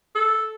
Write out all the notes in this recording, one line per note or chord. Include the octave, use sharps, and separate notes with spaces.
A4